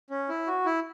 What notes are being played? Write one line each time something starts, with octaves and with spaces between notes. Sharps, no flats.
C#4
E4
F#4
E4